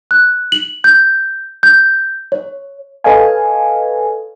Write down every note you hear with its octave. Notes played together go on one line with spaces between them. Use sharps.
F#6
F#7
G6
G6
C#5
A4 B4 C#5 D#5 F5 G#5